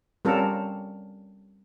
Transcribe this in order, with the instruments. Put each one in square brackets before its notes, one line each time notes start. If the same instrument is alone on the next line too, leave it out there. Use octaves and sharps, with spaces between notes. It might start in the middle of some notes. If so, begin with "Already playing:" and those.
[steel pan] G3 C4 C#4 F4 A4 A#4